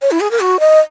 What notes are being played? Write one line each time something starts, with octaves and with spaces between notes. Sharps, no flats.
C#5
E4
G#4
A#4
F#4
D#5